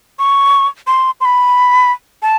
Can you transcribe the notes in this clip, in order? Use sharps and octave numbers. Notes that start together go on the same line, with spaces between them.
C#6
C6
C6
B5
A5